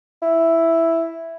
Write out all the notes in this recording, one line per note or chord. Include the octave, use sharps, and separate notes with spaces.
E4